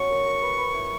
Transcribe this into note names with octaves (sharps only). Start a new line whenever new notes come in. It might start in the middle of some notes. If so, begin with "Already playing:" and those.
Already playing: F#3 C#4 D#5 C#6
A#4
A#4
B4
B4
E4